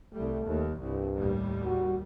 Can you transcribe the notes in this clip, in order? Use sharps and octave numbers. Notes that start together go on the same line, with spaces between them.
C2 G3 A3
D#2
C2 G2
D#2 A2 G3
F#4